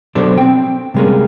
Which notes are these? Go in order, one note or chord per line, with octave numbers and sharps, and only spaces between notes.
B2 F#3 D4 A4 C5 D5
C4 G5
C3 G3 G#3 A#3 C#4